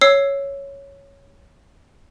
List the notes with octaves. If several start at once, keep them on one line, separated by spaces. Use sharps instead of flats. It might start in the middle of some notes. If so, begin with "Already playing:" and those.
C#5 E6 C7